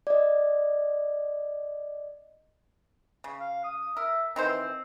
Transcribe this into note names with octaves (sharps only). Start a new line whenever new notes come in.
D5 D#5
C#3
F5
D#6
A#4 E5
D#3 E3 C4 C5